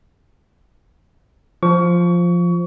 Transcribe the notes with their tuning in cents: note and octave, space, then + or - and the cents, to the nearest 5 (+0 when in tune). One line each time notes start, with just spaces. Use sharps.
F3 +0 C#6 +30